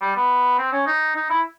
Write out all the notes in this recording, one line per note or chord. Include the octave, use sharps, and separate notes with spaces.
G3
B3
C4
C#4
D#4
D#4
E4